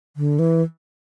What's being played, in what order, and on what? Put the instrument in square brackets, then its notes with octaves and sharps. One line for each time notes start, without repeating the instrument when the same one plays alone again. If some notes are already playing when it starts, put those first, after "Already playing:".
[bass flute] D3
E3